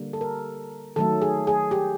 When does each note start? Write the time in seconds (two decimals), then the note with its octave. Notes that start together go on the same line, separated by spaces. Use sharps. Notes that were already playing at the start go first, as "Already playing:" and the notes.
Already playing: D3 G3 A#3
0.13 A4
0.21 A#4
0.96 D#3 F#3 A3 A4
1.22 G#4
1.47 G#4
1.71 G4